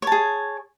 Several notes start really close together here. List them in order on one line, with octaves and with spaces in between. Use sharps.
C#5 A5 G#4